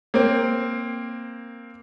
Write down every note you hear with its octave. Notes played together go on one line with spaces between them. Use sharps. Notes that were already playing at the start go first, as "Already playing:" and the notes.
A#3 C4